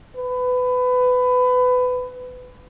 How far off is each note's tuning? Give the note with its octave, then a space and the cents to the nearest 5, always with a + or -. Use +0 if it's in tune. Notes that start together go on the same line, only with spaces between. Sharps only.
B4 +25